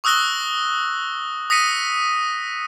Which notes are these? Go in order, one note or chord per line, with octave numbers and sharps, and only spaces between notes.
C#6 D#6 E6 F#6 A#6 G7
D#6 A#6 B6 C#7 D#7